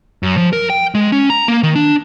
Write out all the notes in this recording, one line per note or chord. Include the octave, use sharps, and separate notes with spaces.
F#2
F3
A#4
G5
G#3
C#4
A#5
A#3
D#3
D4